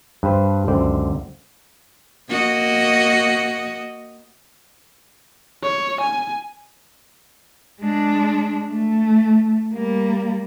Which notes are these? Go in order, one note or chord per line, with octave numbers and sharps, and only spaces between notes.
G2 B4 C5
C#2 F#2 D3 C5 D5 G5
A#3 F#4 D#5
C#5
G#5
G#3 D4
A3
G3 A#3